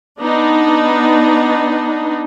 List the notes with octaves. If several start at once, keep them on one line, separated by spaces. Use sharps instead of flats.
B3 D4 D#4